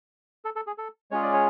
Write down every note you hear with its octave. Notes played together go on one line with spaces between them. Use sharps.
A4
A4
G#4
A4
G#3 C#4 F4 G#4 C#5
D5
C#5